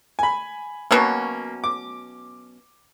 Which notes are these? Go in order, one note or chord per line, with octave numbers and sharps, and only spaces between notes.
G#5 B5
B2 F#3 A#3 C#4
D6